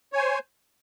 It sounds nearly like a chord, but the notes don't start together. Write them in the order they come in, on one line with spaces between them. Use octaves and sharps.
C#5 G#5 C5